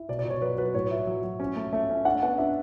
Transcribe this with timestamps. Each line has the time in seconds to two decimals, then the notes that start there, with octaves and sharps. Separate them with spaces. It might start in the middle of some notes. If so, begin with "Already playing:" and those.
Already playing: E4
0.09 B2 D5
0.19 D5
0.25 B2
0.30 C#5
0.41 F#3 B4
0.58 F#3 B4
0.74 A2 C#5
0.91 E4
1.07 F#3
1.23 F#3
1.40 C#4
1.56 A3
1.73 A3
1.90 C#4
2.05 D4 F#5
2.22 B3 F#5
2.38 D4 E5